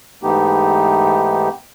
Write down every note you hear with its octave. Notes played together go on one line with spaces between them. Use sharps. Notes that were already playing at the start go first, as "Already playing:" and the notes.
G#2 E3 A3 B3 D#4 G4